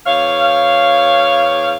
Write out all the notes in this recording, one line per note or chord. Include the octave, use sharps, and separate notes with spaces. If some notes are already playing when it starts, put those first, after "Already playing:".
E2 C#5 F5